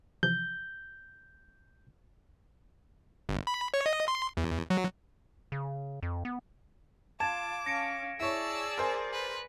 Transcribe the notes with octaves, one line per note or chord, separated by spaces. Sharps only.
C3 E3 F3 G6
G1
B5
C#5
D#5
C6
E2
F#3
C#3
F2
B3
F4 A5 D6 G#6 E7
C#4 F5 A#6 C#7 D7
E4 G#4 C#5 D5 A5 E6
A#4 C5 G#5
B4